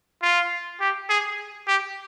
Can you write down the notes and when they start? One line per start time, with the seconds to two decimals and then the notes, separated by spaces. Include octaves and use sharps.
0.22 F4
0.81 G4
1.09 G#4
1.68 G4